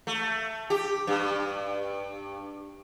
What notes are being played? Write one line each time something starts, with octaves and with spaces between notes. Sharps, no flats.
A3
G4
G2